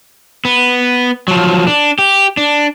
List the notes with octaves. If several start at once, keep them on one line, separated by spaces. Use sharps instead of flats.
B3
F3 F#3
D4
G4
D4